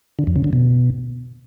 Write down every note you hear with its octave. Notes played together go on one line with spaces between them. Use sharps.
D3
F2
C#3
D3
B2